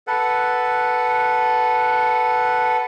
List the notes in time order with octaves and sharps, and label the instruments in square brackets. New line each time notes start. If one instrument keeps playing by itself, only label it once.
[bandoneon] A4 B4 F#5